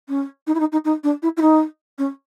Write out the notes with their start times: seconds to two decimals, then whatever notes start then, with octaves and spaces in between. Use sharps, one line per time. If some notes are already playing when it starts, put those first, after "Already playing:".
0.08 C#4
0.47 D#4
0.55 E4
0.60 D#4
0.72 D#4
0.85 D#4
1.03 D4
1.22 E4
1.37 E4
1.41 D#4
1.98 C#4